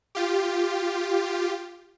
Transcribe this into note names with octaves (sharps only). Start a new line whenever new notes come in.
F4 G4